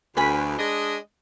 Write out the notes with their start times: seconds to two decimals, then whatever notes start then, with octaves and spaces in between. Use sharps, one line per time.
0.17 D2 B4 G#5 B5
0.59 G#3 D4 D#5